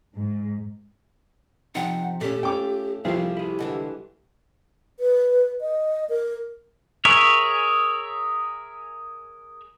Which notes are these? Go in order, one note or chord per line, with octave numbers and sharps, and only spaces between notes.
G#2
C3 F3 D#4 F#5
A#2 A3 C#4 G4
C#4 F4 G5 D6
C2 F3 G4 G#4 C5 F5
E4 G#4
G#2 D3 E3
B4
D#5
A#4
G#4 A#4 C#5 E5